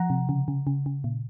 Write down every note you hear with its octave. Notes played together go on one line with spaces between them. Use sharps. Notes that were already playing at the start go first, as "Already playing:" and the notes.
Already playing: F3 F#5 A#5
C3
C#3
C#3
C#3
C#3
A#2